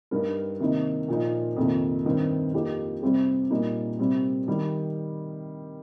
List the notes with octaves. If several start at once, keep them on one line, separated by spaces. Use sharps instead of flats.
G2 G3 D#4 A#4
C3 D#3 A#3 D#4
A#2 F3 D#4
F2 C3 D#3 A#3
G2 D#3 C4
F2 F3 A#3 D#4 G4
C3 G3 C4 G4
A#2 G3 A#3 D#4
C3 G3 C4
D#3 G3